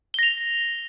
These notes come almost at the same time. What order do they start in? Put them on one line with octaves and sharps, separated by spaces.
G7 A#6 F7